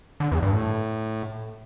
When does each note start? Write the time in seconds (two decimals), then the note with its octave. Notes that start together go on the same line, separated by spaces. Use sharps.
0.20 D3
0.32 E2
0.43 G2
0.53 A2